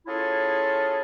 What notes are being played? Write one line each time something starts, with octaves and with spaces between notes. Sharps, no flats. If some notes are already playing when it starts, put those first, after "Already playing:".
C#4 E4 F4 G#4 A4